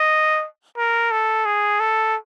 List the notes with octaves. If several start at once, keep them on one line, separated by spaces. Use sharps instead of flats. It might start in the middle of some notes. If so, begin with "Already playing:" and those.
Already playing: D#5
A#4
A4
G#4
A4